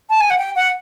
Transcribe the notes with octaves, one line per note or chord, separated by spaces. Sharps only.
A5
G#5
F#5
G5
F#5